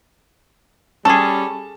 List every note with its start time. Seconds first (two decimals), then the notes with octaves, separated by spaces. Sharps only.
1.05 G3 C#4 G#4 A4 A5